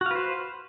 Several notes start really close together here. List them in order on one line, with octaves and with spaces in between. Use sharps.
F#4 F5 B4 C5